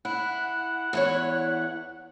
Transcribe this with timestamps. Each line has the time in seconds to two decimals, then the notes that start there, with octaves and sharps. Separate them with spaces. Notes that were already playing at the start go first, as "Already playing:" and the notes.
0.05 E4 F#5
0.93 E2 E4 C#5